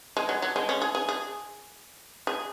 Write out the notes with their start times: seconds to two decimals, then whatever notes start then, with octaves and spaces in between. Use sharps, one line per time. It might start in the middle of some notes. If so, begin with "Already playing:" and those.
0.17 G#3
0.29 F#3
0.42 F#3
0.56 G#3
0.69 C#4
0.82 G#4
0.95 G#4
1.09 G#4
2.27 G#4